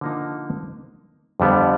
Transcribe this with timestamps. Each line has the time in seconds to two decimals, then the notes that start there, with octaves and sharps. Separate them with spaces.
0.01 D3 F3 A#3 D#4
1.40 F2 D3 G3 B3